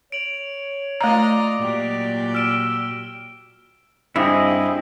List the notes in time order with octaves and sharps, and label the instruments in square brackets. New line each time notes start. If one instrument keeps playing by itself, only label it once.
[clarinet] C#5 [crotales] D7 F7 F#7
[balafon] A3 A#5 [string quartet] F4 D#5 [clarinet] D5
[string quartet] A#2 F#3 G4
[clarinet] E6 [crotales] F6 D7 G7
[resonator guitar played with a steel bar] G2 [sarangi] C4 [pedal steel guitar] E4 G#4 D#5